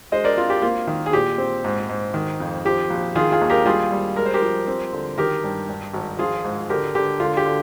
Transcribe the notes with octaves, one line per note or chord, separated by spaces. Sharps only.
G#3 C5 D#5
A#4 D5
C4 F4
G4
A#3 F4
D#3
G#4
A#2 G4
C4
G#2
G#2
D#3
F2
F3 G4
A#1
D#3 F4 G#4
F4 G#4
D#2
G4 A#4
G3 F4 G#4
G3
G#3 A#4
C5
G4 A#4
F3
C4
D3
D#3 G4 A#4
G2
G2
G#1
F3 F4 G#4
G#2
D3 G4 A#4
D3 G4
D3 F4
G4
D3